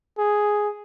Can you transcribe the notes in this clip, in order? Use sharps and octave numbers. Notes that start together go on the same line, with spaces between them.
G#4